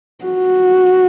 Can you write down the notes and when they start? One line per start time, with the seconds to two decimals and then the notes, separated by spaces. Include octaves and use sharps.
0.24 F#4